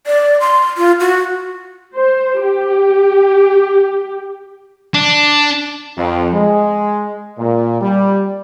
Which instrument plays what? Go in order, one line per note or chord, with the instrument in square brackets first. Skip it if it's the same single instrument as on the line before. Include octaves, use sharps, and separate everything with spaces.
[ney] D5
C6
F4
F#4
[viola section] C5
G4
[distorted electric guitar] D4
[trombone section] F2
G#3
A#2
G3